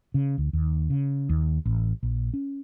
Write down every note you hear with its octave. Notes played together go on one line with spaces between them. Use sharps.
C#3
D2
D#2
C#3
D#2
A1
A#1
C#4